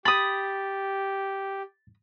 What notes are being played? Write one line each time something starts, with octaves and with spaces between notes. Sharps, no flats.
G4 B5 D#6 A6